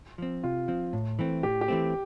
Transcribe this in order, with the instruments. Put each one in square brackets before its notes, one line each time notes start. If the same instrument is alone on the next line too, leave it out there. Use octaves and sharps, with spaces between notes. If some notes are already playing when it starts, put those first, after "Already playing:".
[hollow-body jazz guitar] F3 C4
[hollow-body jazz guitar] C3 [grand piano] F4
[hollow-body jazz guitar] F3 C4
A2
E3 A3 C4
[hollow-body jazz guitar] A2 [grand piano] G4
[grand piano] G4
[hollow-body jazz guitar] E3 A3 C4